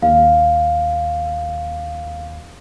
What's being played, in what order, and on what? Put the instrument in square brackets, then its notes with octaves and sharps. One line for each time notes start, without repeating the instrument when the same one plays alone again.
[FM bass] D#2 [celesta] F5